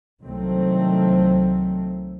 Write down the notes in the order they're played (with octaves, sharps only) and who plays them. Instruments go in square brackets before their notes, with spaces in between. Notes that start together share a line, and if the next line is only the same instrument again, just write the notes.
[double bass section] C2 D#3 F#3 A3 C4